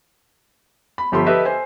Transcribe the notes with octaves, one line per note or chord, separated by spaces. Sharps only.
B5
G1 F3 G4 A4 B5 C6
G4 A4 B4 D#5 E5
C5 G#5